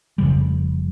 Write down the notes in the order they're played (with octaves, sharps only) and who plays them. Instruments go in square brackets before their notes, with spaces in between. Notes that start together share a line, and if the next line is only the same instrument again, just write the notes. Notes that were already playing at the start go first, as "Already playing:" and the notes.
[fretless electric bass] F1 F2 C#3 G3